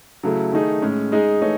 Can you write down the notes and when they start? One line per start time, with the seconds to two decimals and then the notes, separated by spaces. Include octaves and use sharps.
0.23 C#3 F#3 A3 E4 A4
0.52 D#3 A3 D#4 G#4
0.82 A2 G#3 C#4
1.12 G#3 D#4 G#4
1.41 E3 A3 D#4 G#4 C#5